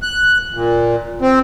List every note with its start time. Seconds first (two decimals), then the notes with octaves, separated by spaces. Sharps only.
0.02 F#6
0.54 A#2
1.21 C4